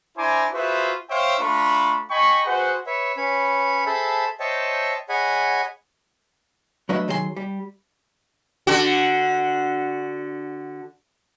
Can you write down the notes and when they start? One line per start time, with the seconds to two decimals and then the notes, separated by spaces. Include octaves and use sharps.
0.17 D4 E4 C5 G#5 A#5 D6
0.53 F4 F#4 G#4 B4 C5 E5
1.10 C5 C#5 E5 F5 G5
1.40 A3 D4 F4 A#5 B5 C#6
2.10 D#5 G5 G#5 B5 C#6
2.46 F#4 G#4 B4 C5 F#5
2.86 B4 C#5 E5
3.17 C#4 B4 C#5 B5
3.86 G#4 A4 C5 E5 A5 B5
4.40 C5 C#5 D#5 E5 G5 A5
5.09 G#4 C#5 D#5 F#5 G#5 B5
6.89 F#3 A3 D4 B4 D#5 E5
7.08 D#3 F#3 G#4 E5 C6
7.37 G3
8.67 D3 F#4